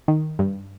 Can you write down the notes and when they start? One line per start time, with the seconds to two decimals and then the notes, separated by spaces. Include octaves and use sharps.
0.08 D#3
0.39 G2